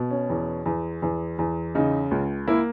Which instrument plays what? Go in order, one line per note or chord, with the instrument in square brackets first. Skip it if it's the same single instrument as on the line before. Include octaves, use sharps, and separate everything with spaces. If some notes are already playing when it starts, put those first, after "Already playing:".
Already playing: [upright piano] B2
C#4
E2
E2
E2
E2
C#3 D#4
C#2
A#3 E4